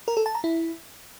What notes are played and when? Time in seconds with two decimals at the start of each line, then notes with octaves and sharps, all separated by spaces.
0.08 A#4
0.17 A4
0.26 A5
0.35 A#5
0.44 E4